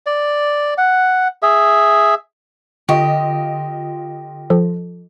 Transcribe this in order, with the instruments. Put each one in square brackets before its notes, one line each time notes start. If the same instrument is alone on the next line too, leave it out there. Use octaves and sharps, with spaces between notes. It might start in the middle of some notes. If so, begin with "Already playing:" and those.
[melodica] D5
F#5
G#4 E5
[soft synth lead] D3 [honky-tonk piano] F4 D#5 [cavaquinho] G4 [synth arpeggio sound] C#6
[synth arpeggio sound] F3 A4